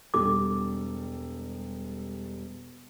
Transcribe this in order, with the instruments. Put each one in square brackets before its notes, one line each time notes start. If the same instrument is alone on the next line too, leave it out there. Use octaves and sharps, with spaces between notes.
[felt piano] E1 G3 A4 [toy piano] D6